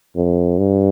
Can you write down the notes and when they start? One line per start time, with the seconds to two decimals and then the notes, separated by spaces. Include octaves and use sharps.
0.16 F2
0.58 G2